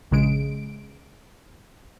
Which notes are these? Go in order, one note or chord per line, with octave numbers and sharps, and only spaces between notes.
A#1 C#3 G#3 D7